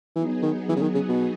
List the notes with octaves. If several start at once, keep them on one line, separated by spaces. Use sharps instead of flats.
E3 F#3 B3 D#4 G#4
D#3
E3
C#3
D#3
C#3
B2